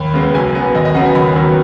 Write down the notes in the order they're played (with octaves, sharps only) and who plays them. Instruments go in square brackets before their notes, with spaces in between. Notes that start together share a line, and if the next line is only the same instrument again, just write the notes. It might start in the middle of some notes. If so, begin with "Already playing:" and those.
Already playing: [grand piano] D#2 B5
C#3 G#3 B3
B1 G#5
B2 B3
D#2 D#5
D#5
C#3 F#3 B3 F#5
G#5
D#2 B5
D#3 F#3 B3